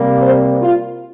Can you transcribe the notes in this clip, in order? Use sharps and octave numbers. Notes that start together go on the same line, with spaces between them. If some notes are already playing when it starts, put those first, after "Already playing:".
Already playing: C3 G3 A#3
C5
F4